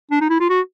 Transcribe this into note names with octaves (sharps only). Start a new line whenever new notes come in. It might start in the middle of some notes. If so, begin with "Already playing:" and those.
D4
D#4
E4
F4
F#4